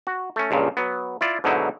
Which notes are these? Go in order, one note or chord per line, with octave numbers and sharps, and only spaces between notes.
F#4
A3 C#4
C#2 G2 A#2 C#3
F#3 B3
E4 F4 D5
G#2 B2 D3 F#3 D#4 E4